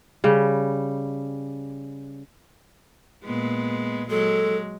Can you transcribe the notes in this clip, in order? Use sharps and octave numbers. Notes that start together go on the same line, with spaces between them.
C#3 G3
A#2 G#3 B3
F#3 G#3 A4